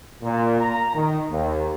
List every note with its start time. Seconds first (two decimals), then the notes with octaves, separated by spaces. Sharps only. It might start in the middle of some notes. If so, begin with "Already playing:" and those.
0.23 A#2
0.60 A#5
0.96 D#3
1.31 D#2